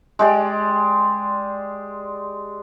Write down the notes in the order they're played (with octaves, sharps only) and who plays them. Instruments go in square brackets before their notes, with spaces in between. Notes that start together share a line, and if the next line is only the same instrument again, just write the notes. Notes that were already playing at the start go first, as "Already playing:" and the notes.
[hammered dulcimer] G#3 G4 D5